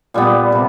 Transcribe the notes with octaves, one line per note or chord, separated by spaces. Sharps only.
A#2 G3 B3
C3